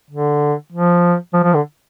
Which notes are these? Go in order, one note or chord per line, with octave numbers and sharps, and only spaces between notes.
D3
F3
F3
F3
D3